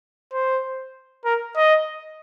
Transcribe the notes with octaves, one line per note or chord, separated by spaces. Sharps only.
C5
A#4
D#5